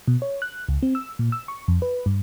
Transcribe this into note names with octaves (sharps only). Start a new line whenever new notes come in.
B2
C#5
F#6
C#2
C4
E6
A#2
E6
C#6
F2
B4
G2